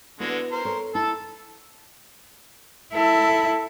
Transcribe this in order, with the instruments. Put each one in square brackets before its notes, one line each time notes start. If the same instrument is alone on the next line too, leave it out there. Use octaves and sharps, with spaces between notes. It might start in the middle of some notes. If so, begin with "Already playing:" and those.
[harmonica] D3 G#3 F#4 [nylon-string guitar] B3 E4
[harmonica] A#4 C5
[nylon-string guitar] A4 C#5
[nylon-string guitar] E4 [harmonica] A4 A5
[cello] E4 A4